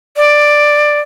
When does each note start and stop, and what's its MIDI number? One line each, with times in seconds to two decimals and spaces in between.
0.17 1.00 74